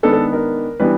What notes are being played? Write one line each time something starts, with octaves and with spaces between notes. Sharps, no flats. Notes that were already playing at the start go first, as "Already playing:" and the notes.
D#3 G#3 B3 D4 A4
A4
A#4
E3 G3 B3 D4 B4